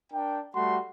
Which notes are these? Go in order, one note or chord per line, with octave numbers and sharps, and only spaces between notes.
D4 A#4 G5
G3 A3 F#4 F#5 C6